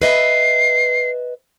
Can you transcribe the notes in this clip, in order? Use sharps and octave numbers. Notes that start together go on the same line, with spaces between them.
B4 D#5 E5 C7